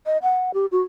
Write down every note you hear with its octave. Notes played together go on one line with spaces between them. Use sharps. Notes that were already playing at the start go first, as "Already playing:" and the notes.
D#5
F#5
G4
F#4